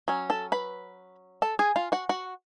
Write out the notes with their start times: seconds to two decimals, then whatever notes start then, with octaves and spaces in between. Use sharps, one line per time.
0.08 F#3 C#4
0.30 A4 A5
0.52 B4 B5
1.42 A4 A5
1.59 G#4 G#5
1.76 F4 F5
1.92 F#4 F#5
2.09 F#4 F#5